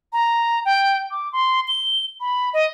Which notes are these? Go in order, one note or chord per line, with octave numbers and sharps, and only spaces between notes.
A#5
G5
D6
C6
G7
B5
D#5